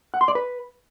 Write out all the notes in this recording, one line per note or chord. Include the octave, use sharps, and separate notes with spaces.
F#5
C6
D5
B4